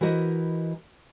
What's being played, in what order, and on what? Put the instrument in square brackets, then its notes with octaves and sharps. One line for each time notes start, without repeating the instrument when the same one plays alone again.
[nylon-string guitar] E3 E4 F#4 A#4 C5 D#5